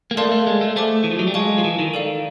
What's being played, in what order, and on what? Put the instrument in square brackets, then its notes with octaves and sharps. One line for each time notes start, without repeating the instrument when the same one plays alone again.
[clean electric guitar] A#3
[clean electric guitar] A3 [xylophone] A#4 D5 F5 A5 C6
[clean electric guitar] A3
G#3
A3
[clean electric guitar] A3 [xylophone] G#4 C5 E5 A5 D6
[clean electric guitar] E3
F3
F#3
G3
[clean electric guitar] G#3 [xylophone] F5 A5 C#6
[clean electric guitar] F3
E3
D#3
[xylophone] A4 D5 F5